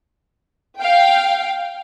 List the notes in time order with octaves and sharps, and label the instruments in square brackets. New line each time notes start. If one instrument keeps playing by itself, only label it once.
[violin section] F5 G5